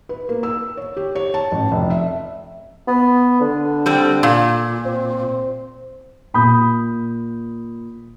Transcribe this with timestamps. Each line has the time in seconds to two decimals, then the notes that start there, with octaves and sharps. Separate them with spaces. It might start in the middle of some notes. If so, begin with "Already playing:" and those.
0.09 B4
0.29 A#3
0.43 E6
0.77 C#5
0.97 G4
1.15 C#5
1.34 A5
1.52 A1
1.72 F1
1.90 E5
2.87 B3
3.41 D3
3.86 G3 C4
4.23 A#2
4.85 C4
6.34 A#2 B5 D#6 G6